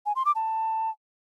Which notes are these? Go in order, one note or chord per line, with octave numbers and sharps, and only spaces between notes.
G#5
C6
D6
A5